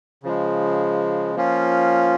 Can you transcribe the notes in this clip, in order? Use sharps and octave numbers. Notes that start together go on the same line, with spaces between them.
C#3 F3 G#3
F3 A#3 C#4 F4